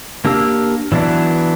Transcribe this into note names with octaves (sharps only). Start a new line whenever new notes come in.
A#3 D4 G4 E6
E3 F#3 B3 D4 E4